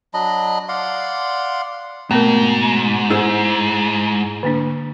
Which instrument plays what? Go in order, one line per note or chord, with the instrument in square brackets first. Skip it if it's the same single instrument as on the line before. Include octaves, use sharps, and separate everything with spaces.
[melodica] F#3 D4 D#5 B5
D5 F5 F#5 C6
[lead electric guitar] G#2 [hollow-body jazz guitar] B2 [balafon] A3 C4 A#4
[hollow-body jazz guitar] E4 G#4 C5
[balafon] D3 A#3 D4